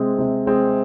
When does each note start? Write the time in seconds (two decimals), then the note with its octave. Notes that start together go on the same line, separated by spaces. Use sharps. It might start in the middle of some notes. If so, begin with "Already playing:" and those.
Already playing: C3 G#3 C4 G#4
0.19 C3
0.46 G#3 C4 G#4